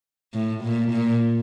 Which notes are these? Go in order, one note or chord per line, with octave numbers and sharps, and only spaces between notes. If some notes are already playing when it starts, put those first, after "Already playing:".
A2
A#2
A#2